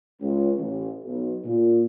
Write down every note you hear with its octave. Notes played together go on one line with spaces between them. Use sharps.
C#2
A1
B1
A#2